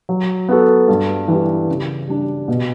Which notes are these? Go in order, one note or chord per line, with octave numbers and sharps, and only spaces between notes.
F#3
B3 F#4 A4
G2
E3 G3
C#3
G3 D4
B2